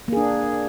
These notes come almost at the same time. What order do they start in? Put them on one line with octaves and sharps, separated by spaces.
A#3 G#4 D4